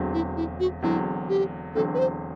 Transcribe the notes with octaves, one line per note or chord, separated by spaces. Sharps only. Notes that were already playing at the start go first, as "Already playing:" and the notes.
Already playing: E1 E2 D3 F#3 C4
E4
E4
F#4
E1 E2 D3 F#3 C4 E4
G4
E1 E2 D3 F#3 C4 A4
B4
C5